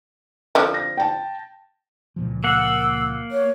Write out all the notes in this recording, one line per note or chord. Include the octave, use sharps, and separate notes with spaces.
D3 F3 C4
A#6
G5 A5
C#2 A#2 F3
A#3 F#5 E6
C#5